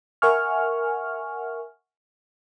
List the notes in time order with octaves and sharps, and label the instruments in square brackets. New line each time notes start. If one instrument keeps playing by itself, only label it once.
[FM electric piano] A#4 E5 F#5 G#5 C#6 F6